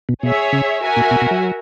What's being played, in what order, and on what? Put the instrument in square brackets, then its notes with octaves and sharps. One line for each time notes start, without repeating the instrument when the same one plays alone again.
[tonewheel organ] B2
[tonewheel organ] B2 [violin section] G#4 C#5 E5
[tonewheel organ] C#3
[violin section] F#4 A#4 E5 G#5
[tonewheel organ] A#2
B2
B2
F#3